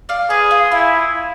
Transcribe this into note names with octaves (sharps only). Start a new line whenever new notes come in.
D5 F5
G#4 B4 D5
F4
E4 F4